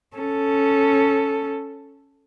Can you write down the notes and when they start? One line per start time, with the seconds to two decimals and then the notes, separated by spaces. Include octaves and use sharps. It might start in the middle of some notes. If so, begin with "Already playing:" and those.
0.17 C#4 A4